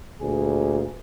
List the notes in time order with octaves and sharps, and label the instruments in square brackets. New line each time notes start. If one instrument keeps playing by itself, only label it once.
[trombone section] D2 A#2 G#4